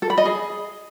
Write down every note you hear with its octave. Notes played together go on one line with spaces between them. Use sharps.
A4
B5
D#5
G#4